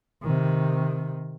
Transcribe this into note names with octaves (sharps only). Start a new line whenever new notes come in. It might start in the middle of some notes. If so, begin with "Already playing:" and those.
C3 D#3